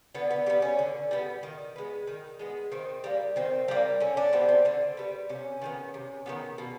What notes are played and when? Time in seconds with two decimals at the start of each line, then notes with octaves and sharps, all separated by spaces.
0.15 D3 B3
0.31 B3
0.46 G3 C4
0.50 B3
0.62 C#4
0.79 D3
1.11 G3 B3
1.43 D#3
1.76 G#3 B3
2.07 D#3
2.39 G#3 B3
2.72 D#3 C4
3.04 G3 A#3
3.36 D#3 C4
3.68 G3 A#3
4.00 D3 C#4
4.17 D4
4.33 G3 B3 C4
4.48 C4
4.65 D3 C4
4.97 G3 B3
5.29 C3 C#4
5.61 D#3 G3 B3
5.94 C3
6.26 D#3 G3 B3
6.58 B2